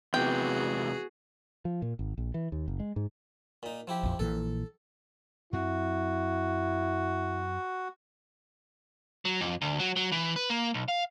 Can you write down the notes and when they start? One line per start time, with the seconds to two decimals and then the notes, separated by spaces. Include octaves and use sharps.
0.14 E2 C3 B3 E4 F#4 G#4 B4 G5
1.65 F3
1.82 A#2
1.99 G#1
2.18 A#1
2.34 E3
2.52 D#2
2.68 F#1
2.80 G#3
2.96 G#2
3.63 A#2 D#4
3.88 F3 E4 G4
4.03 A#1 F2
4.19 A#1 A#2 E3 A4
5.53 F#2 C4 E4 F#4
9.25 F#3
9.41 F2
9.62 D2
9.79 F#3
9.96 F#3
10.12 E3
10.36 B4
10.50 A#3
10.74 B1
10.88 F5